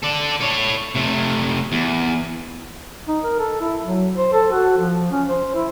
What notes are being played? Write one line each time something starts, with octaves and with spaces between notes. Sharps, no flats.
A4 D5
A4 C#5
C3 A3
E2
D#4
A#4
A4
E4
F#3
C5
A4
F#4
F3
C#4
C5
E4